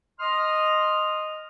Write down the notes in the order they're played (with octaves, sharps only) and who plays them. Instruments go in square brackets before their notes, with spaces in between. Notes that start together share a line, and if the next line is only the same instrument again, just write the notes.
[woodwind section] D#5 C6 D#6 F6